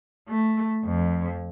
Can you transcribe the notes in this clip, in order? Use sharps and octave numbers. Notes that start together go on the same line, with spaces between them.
A3
F2